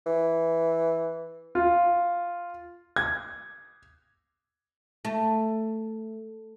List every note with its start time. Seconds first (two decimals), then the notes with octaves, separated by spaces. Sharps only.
0.06 E3
1.55 F4
2.96 G#6
5.05 A3